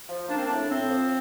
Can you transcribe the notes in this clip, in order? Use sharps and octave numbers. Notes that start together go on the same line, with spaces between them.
F3
A#3 D4
C4
A2 D4
A2 C4
F3